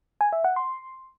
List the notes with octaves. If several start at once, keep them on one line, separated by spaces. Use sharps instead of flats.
G#5
E5
F#5
C6